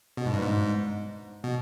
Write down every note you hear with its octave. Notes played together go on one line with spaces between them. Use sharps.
B2
G#2
G2
G#2
B2